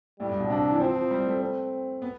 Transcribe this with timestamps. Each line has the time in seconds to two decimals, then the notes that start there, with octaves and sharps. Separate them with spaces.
0.20 A2 G3
0.29 G2
0.40 B2
0.49 C3 D4
0.70 E3
0.80 F3 C4
0.95 F3
1.11 G3
1.26 A3
1.41 C4
2.02 B3